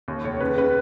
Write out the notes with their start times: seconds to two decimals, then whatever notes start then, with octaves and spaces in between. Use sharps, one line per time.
0.08 D#2
0.24 F1 C#5
0.41 C#3 B4
0.57 C#3 B4